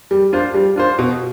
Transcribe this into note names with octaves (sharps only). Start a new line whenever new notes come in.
G3
D4 F4 C5
G3
D4 F4 C5
B2